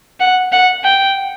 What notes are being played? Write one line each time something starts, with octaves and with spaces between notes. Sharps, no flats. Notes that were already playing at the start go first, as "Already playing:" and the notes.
F#5
F#5
G5